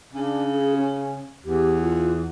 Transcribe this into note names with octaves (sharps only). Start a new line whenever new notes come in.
C#3 D4
G#4
C#4
E2 G4
F4